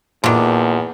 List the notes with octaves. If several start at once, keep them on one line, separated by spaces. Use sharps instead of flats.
E2 A#2 D3 D#3